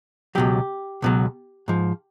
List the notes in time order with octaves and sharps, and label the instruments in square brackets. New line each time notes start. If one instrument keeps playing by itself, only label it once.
[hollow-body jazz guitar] C#2 B2 F#3 G4
C#2 B2 F#3
G#2 F3